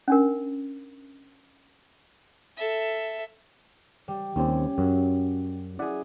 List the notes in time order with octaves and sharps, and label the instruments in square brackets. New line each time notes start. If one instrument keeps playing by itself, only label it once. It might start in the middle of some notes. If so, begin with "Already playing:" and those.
[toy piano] C#4 D4 A#4
[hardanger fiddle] A4 E5
[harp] G3
[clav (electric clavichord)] D#2 C4 [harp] G3 C#4
[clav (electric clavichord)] F#2 [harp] F#3
[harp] E4 G#4 [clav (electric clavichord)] D5 F#5